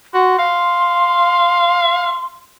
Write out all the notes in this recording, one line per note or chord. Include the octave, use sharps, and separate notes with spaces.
F#4 C6
F5